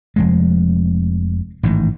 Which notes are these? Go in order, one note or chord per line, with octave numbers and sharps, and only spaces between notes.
F1 F2 G#3
A1 G#2 D#3